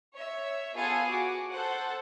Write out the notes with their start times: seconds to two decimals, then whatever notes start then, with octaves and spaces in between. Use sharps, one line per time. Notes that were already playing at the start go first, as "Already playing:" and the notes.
0.13 C#5 E5
0.74 B3 F4 G#4 A4
1.07 F#4 D6
1.50 A4 C5 F#5